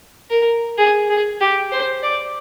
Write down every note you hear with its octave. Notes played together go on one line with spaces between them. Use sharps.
A#4
G#4
G#4
G4
C5
D5